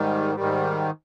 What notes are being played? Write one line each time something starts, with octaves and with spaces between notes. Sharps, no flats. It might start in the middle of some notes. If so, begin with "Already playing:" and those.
Already playing: G#2 D#3 G3
G#2 D#3 G3